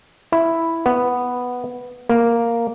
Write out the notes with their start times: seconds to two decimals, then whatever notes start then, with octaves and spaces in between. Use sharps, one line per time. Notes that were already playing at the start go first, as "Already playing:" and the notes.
0.32 E4
0.86 B3
2.09 A#3